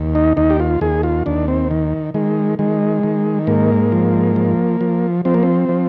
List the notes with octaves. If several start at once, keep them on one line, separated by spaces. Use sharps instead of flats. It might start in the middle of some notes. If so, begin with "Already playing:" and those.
Already playing: D#2
D#4
D#2 D#4
G4
F4
D#2 G#4
F4
D#2 D4
C4
D#3
D#3 G#3
D#3 G#3
D#3
G#2 A#3
F3
F3
F3
F3 C4
A#3
C4
F3